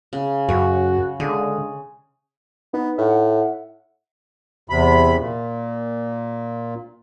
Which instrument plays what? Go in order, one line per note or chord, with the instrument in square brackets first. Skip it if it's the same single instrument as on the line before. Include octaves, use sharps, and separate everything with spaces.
[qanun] C#3
[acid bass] F#2 [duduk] F#4 [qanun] C#5
[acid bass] D3 [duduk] G#3 [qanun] G#4
[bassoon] B3 [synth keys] D#4
[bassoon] A2 [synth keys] E5 F#5
[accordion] E2 C3 B5
A#2